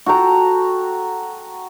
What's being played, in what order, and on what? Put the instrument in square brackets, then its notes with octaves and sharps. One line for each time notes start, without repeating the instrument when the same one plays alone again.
[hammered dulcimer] F#4 A4 G5 A#5